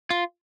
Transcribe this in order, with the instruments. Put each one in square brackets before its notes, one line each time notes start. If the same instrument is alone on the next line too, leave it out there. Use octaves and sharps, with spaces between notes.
[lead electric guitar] F4